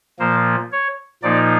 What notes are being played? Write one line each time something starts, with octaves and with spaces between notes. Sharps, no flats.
A#2 F3 A#3 C5
C#5
A#2 F3 A#3 D#4 D5